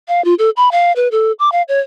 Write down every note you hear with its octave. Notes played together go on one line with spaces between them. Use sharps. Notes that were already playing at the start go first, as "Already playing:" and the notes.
F5
F4
A4
B5
F5
B4
A4
D6
F5
C#5